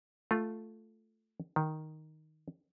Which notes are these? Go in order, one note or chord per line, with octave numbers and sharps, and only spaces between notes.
A3 F4
D#3